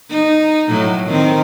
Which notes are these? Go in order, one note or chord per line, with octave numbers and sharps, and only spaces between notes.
D#4
A2 F#3
D#3 C4